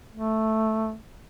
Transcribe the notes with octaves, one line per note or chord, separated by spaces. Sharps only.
A3